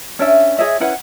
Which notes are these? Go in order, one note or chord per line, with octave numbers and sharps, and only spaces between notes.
C#4 D4 E5
G#4 C#5 D#5 E5
C#4 E4 B4 F#5